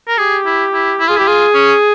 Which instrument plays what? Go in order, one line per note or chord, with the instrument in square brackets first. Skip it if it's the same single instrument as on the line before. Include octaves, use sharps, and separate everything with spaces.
[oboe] A#4
[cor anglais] G4 [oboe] G#4
[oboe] E4
E4
E4
[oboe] F4 [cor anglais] G#4
[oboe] E4
[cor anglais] G4
[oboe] F4 [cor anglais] G#4
[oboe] C#4